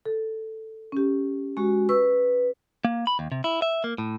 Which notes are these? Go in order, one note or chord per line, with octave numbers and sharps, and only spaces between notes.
A4
C#4 G4
G#3 F#4 C#6
B4 C#6 E6
A#3
B5
D#2
C3
E4
E5
A#3
A2